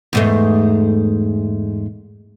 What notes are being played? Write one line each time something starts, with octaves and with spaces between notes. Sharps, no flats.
E2 G#2 A3